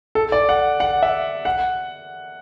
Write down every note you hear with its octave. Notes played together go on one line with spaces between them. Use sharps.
A4
D5
F#5
F#5
E5
F#5